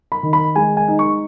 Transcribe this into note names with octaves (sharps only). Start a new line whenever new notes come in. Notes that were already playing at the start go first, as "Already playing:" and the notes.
B5
D#3
B5
G#3 G#5
G#5
D#4
C#6